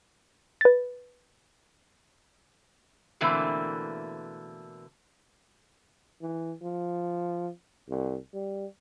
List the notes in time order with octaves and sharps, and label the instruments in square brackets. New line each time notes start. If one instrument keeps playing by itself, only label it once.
[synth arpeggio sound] B4 A6
[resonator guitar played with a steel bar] B2 D3 E3 A3 A#3 C4
[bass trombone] E3
F3
C2
G3